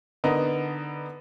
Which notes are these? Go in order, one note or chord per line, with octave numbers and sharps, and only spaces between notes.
D3 B3 D#4 A#4